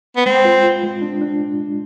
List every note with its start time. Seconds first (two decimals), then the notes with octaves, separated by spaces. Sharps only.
0.17 B3
0.26 G#3 C4
0.45 F4
0.64 F4
0.83 G#3
1.02 D4
1.21 D4
1.40 G#3
1.59 G#3